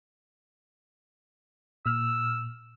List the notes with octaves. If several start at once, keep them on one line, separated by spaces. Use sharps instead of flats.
A#2 E6 F6